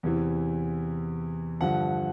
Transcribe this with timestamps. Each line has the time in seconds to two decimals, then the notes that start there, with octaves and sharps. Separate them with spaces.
0.03 E2 C3 E3
1.61 G2 D3 F3 F#5